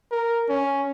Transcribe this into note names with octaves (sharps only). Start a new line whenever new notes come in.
A#4
C#4